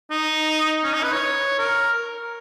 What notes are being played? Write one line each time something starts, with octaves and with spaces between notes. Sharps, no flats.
D#4
C#4
D#4
B4
C#5
A#4